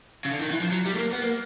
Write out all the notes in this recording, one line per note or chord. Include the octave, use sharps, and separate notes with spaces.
C#3
D3
D#3
E3
F3
F#3
G3
A3
A#3
B3
A#3